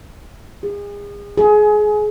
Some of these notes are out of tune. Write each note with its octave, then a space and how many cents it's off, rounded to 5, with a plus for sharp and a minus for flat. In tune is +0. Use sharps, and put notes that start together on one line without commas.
G#4 -35
G#4 +25